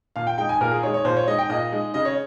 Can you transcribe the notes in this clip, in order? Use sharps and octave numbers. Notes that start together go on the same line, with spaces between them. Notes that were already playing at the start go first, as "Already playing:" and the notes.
A#2 F5
G5
G#3 D#4 G5
G#5
A#2 A#4
G#4
G#3 D#4 C#5
C#5
A#2 C5
C#5
G#3 D#4 D#5
G5
A#2 D#5
G#3 D#4
C#3 D#5
C#5